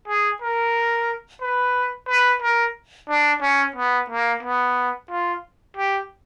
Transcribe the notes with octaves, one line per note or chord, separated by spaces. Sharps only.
G#4
A#4
B4
B4
A#4
D4
C#4
B3
A#3
B3
F4
G4